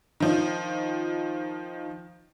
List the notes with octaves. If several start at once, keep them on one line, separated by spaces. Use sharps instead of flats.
D#3 F3